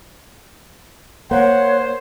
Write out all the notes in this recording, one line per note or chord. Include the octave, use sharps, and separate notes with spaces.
A#3 C5 C#5 F#5